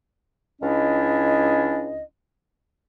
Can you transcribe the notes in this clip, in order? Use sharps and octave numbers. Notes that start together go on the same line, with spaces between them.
C#2 C#4 D4 E4 D#5